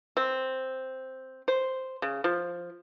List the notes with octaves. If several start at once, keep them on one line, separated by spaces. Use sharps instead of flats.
C4
C5
C#3
F3